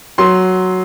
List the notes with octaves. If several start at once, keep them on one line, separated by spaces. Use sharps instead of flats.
F#3 C6